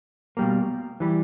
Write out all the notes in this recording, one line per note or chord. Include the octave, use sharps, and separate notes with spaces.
B2 G3 A#3
E3 G3